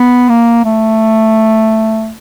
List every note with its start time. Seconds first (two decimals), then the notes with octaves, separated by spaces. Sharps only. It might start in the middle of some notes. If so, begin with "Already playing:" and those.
Already playing: B3
0.29 A#3
0.65 A3